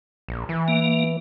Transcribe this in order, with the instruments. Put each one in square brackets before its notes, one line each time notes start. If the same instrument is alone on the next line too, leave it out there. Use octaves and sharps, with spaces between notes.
[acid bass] A#1
E3
[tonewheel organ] A#3